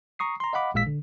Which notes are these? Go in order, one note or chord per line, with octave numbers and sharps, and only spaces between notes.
A#5 C#6 D#6 C7
A#5 C6
D#5 F5 F#5 B5 D6
A1 A#2 G#3 F5 E6 B6
D3